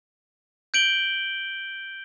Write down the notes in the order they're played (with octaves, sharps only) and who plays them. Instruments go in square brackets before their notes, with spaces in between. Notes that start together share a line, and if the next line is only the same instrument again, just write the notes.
[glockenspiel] G6 D7 F#7 G7